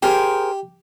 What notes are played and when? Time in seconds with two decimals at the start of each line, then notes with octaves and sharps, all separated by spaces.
0.03 G4 G#4 A#4 C5